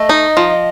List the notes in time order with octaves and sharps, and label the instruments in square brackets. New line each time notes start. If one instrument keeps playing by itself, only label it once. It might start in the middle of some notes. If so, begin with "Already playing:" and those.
Already playing: [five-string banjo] A3 [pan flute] D#5
[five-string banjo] D#4
F3